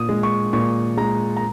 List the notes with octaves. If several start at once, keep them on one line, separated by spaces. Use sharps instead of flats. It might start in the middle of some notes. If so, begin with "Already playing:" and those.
Already playing: A#2 D#6
G#3
C#6
A#2 C#6
G#3 A#5
A#5